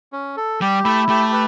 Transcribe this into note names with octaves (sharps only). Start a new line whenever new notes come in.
C#4
A4
G3 G4
A3 E4
A3 G4
B4